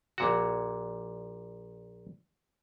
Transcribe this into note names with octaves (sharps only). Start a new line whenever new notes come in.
A#1 A#2 F#4